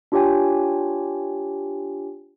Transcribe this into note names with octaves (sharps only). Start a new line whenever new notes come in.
D4 F4 G4 C#5 G5 G#5